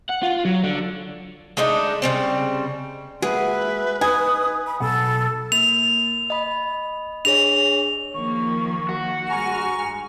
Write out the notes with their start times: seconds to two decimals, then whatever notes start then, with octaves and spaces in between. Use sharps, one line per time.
0.09 F#5
0.23 F4
0.45 F#3
0.64 D3
1.57 G#3 A3 D4 D#4
2.02 C#3 G3 C4
3.22 G#3 A#3 F#4 G#4 B4 E5
4.01 D#4 G#5 D#6
4.67 B5
4.80 B1 B2 A4 F#5
5.52 A#3 F7
6.30 D#5 B5
7.25 D4 G#4 C#5 F7
8.14 D#3 F3 A#3 C#6
8.89 F#4
9.29 G2 G#3 G#5 A#5 C#6 F6